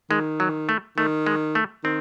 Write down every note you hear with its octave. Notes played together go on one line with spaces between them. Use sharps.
D#3 G#3
F#3
A3
D#3 A3
G#3
A3
D#3 C4